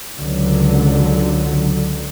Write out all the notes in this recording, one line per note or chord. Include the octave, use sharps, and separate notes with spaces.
C#2 D3 F#3